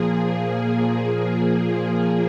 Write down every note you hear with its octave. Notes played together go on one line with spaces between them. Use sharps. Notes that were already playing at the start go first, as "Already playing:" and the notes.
Already playing: A#2 F3 A#3 G#4
G#4